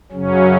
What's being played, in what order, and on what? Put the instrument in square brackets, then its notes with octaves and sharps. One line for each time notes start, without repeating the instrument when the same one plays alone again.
[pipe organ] F#2 C#3 F#3 C#4